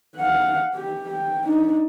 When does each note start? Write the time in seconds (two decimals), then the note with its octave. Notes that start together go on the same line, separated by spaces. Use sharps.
0.17 F5 F#5
0.75 G4
1.08 G5
1.46 D4 D#4